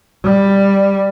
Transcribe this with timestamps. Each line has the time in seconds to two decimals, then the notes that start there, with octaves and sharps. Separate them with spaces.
0.24 G3